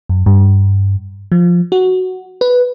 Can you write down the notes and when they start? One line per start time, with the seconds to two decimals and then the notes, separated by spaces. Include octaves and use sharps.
0.09 F#2
0.26 G2
1.32 F3
1.72 F#4
2.41 B4